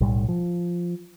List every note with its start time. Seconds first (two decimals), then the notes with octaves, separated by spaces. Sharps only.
0.01 B1 A2 G3
0.28 F3